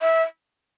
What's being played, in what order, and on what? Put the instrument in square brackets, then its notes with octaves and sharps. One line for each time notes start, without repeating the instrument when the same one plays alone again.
[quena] E5